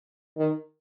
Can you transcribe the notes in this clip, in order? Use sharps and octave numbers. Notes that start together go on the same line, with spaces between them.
D#3